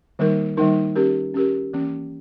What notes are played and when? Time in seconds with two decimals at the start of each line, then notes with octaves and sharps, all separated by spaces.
0.19 D#3 G3 A#3 D#4 A#4
0.57 D#3 G3 A#3 D#4 A#4
0.96 C#4 G4 A#4
1.34 C#4 G4 A#4
1.73 E3 A#3 C#4